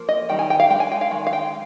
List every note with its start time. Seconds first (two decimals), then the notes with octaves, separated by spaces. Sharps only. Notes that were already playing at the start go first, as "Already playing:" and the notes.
Already playing: F3 A#3
0.09 D#5
0.29 D#3 G3 D#4 G5
0.39 G#5
0.50 G5
0.60 F5
0.70 G#3 G5
0.75 D4
0.80 G#5
0.92 G5
1.01 F5
1.11 D#3 G#3
1.27 F5
1.33 G5